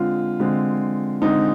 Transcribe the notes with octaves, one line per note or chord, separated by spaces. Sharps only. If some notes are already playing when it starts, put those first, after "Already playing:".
Already playing: D3 G#3 C4 F4
D3 G#3 C4
D3 G#3 C4 D#4